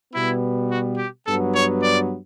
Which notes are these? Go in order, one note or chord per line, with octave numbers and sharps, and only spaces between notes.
B2 G3 B3 E4
F#4
G4
G2 F#3 B3 A4
C#5
D5